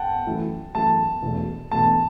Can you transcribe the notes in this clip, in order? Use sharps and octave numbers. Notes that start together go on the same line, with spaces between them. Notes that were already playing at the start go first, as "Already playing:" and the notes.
Already playing: F#5 G5 A5
F#2 E3 A3 E4
F#2 E3 A3 E4 A5
E1 E2 B2 A3
E1 E2 B2 A3 A5